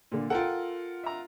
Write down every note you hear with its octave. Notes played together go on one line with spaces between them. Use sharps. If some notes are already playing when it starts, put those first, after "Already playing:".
A#2 D3
F4 A4 A#4 F#5 G5
E5 A#5